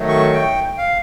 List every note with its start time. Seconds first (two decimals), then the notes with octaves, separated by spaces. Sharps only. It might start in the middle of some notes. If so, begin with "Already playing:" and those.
Already playing: D#3 F#3 A3
0.08 C#6
0.33 G5
0.78 F5